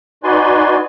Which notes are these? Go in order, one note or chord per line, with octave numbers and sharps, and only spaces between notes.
D#4 F#4 B4 D5 G#5 C6